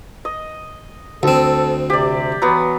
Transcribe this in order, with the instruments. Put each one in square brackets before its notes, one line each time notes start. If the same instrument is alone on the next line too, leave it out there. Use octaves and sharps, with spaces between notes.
[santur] D#5
[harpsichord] D2 C4 [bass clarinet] A4
[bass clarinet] C3 [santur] G4 D5
[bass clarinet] E3 [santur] F#3 B3